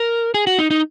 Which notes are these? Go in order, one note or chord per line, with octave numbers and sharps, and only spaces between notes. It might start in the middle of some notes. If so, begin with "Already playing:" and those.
Already playing: A#4
G#4
F#4
D#4
D#4